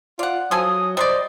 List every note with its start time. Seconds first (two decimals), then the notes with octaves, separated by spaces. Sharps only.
0.19 F4 D5 F#5
0.51 F3 F#3 A4 G#5 D#6
0.97 G3 B4 C5 D5 D#5